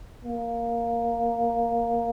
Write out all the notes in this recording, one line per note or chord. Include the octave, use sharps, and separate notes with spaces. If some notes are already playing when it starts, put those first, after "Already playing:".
A#3